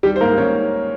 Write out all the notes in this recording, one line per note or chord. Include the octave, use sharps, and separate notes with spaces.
D#3 G3 G4
C5
G#2 A#3 A#4
D#3 C#4 C#5